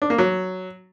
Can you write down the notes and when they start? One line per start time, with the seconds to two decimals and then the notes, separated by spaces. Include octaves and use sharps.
0.02 D4
0.10 A#3
0.18 F#3